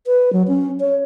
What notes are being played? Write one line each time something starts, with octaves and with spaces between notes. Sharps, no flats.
B4
F#3
C#4
C#5